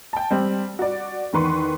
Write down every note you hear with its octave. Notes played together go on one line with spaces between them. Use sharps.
G5 A5
G3 C4
F#4 D5
E2 D#3 B4 C6 C#6